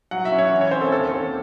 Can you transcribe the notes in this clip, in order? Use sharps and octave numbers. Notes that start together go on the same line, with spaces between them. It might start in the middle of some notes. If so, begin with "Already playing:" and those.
F#3 F#5
E5
C#4
C#5
E3
C#5
C4 C5
A4
D#2 A4
D#2